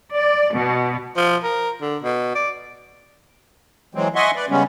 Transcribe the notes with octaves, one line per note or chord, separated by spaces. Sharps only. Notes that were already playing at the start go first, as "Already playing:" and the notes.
D5
B2
F3
A#4
D3
B2
D5
E3 F#3 G#3 C4
D#5 E5 F#5 G#5 C6 C#6
B4 D5
C#3 G3 G#3 B3 C#4